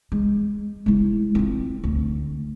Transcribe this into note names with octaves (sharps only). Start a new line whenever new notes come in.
G#3
G#3 E4
C4 F4
D2